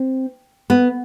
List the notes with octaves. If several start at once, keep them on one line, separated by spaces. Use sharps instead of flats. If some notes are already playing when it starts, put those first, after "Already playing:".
Already playing: C4
B3